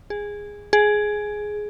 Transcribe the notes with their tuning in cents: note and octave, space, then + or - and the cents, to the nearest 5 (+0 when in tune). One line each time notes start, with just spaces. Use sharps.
G#4 -10
G#4 +10